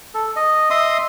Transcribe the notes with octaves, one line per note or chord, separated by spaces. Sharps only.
A4
D#5
D#5 E5 C6 D#6